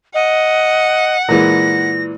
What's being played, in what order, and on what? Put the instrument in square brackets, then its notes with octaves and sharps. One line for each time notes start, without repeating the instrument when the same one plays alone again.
[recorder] D#5 [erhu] F#5
[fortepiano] A#2 E3 G#3 [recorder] A#6